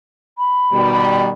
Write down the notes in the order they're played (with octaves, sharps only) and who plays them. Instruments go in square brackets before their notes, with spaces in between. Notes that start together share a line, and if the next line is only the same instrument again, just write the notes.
[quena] B5
[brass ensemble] B2 D#3 G3